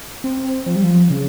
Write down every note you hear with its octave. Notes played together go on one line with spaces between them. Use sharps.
C4
F3
G3
F3
C#3